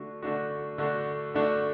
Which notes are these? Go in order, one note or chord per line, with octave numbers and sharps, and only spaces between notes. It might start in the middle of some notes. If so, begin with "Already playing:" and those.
Already playing: D3 A3 D4 F#4
D3 A3 D4 F#4
D3 A3 D4 F#4
D3 A3 D4 F#4